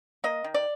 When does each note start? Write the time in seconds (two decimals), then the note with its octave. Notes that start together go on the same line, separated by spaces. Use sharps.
0.24 A#3 D#5
0.44 D#3
0.54 D5